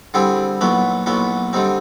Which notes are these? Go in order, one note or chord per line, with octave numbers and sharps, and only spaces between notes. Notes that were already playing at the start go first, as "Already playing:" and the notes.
D3 G3 C4 E4 G#4
B1 A#2 F#3 B3 E4
B1 A#2 F#3 B3 E4
D3 G3 C4 D#4